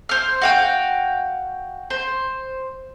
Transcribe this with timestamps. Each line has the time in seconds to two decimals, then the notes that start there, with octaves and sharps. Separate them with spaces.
0.09 C5 F6
0.41 F#4 F5 G5
1.90 C5